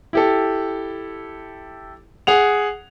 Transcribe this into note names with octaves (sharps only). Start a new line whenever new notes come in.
E4 G4 A4
G#4 F#5 F7